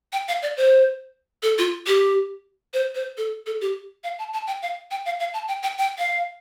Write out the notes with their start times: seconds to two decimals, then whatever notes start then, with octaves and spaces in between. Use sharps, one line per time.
0.13 G5
0.28 F5
0.42 D5
0.57 C5
1.43 A4
1.58 F4
1.87 G4
2.74 C5
2.95 C5
3.17 A4
3.46 A4
3.61 G4
4.04 F5
4.19 A5
4.33 A5
4.47 G5
4.62 F5
4.91 G5
5.06 F5
5.20 F5
5.34 A5
5.48 G5
5.63 G5
5.78 G5
5.98 F5